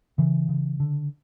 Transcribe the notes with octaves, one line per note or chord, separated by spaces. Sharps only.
C#3 E3
C#3
D3